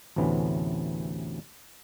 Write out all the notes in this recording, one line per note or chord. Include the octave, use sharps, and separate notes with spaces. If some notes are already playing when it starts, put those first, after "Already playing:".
A1 D2 C3 E3 B3 C#4